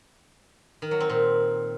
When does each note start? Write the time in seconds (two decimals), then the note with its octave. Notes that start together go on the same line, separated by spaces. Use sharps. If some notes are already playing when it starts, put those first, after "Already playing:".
0.82 D#3
0.91 F#3
1.00 C4
1.10 A#2